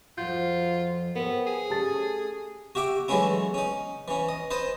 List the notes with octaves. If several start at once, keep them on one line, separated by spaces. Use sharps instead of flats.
F2 F3 F4 F#4 G6
B3 C4 G4 A4 A#4
G#4
A3 C#4 G4 A5 A6
F#4 G4 E5 D6
E3 F#3 G#3 A3 C#4 E4
C#4 D#4
E3 C#4
D#5
B4 C5 D#5 A5